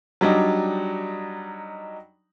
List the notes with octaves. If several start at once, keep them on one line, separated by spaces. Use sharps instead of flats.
F#3 G3 D4 D#4